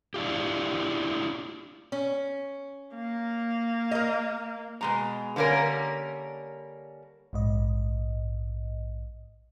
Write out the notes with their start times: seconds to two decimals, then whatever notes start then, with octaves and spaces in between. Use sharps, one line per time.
0.14 D4 E4 F4 G4
1.92 C#4
2.96 A#3
3.91 A#4 D#5
4.81 B2 G#3 A#5
5.36 D3 G3 A#3 C#4 A#4
7.33 A#1 G#2 D#5